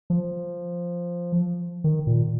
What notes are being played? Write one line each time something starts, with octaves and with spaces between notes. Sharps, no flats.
F3
D#3
A#2